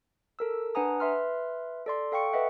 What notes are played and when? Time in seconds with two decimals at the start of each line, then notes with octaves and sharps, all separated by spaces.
0.39 A4 A#4 E6
0.75 D4 B4 F#5 G#5 A#5 D#6
1.00 B4 E5 C6 F6
1.86 A4 D5 C6
2.12 A4 F5 G5 C#6 C#7
2.33 B4 D#5 E5 F#5